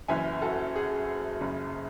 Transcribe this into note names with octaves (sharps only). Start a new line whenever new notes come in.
F#1 F#2 E3 E5 G#5
F#4 A4
G#4
F#1 F#2 C#3